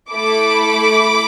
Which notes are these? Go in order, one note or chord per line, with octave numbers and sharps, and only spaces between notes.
A3 E4 A4 B5 D6